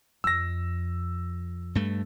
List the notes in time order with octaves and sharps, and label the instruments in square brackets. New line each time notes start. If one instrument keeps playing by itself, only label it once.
[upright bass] F2 [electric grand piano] E6 A#6
[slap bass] G2 A3